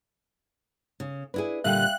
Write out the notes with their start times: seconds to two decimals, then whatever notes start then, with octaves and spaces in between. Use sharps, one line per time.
1.00 C#3
1.34 D4 E4 G#4 B4
1.64 A#2 D3 G3 E5 F5 G5 F#6